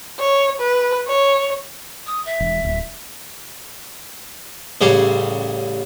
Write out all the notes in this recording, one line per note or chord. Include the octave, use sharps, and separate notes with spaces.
C#5
B4
C#5
D#6
E5
E1
D1
A1 C#3 G3 C#5 C6 D6